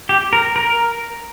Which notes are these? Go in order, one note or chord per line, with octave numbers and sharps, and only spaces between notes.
G4
A#4
A#4